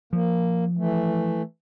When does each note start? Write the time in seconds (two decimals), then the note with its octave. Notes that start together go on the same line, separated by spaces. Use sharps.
0.13 F3 A#3
0.77 E3 A3